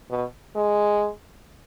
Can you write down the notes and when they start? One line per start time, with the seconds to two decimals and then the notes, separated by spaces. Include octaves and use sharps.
0.10 B2
0.55 G#3